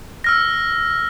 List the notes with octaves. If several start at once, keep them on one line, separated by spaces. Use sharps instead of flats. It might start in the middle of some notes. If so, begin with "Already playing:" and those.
E6 F6 A#6